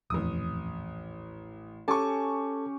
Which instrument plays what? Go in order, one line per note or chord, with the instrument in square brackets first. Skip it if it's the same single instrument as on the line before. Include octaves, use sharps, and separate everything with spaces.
[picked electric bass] D#1 F2 [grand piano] A1 D#6
[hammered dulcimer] C#4 G4 [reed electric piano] A4 G#5 A5 [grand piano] C#6 D6